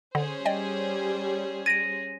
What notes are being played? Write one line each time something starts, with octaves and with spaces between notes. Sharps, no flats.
D3 C#4 G#4 C5
G3 D5 D#5 G5
G#6 A#6 D7 D#7